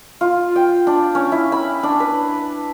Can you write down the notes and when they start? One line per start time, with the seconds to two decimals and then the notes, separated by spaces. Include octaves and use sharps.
0.21 F4
0.56 G5
0.87 D4
1.15 C#4
1.32 E4
1.52 B5
1.83 D4
2.00 B4